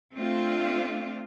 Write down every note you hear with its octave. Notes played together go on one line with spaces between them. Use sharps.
A3 C4 D4 F4